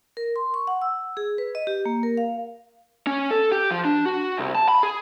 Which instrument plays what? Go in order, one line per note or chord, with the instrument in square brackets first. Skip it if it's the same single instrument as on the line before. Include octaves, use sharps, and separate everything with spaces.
[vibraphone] A#4
C6
C#6
F#5
E6
G#4
B4
D#5
G4
A#3
A#4
F5
[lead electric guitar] C#4
A4
G4
F3
D4
F#4
C2
A5
B5
G#4